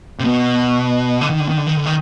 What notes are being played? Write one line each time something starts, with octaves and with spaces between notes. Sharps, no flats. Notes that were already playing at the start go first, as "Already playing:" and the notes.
C3
B2
D3
D#3
D3
D#3
D3
D#3
D3
D#3